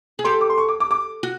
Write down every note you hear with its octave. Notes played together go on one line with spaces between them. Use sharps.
G#4
G4 A4 C6
D6
C6
C#6
D6
D6
D6
F#4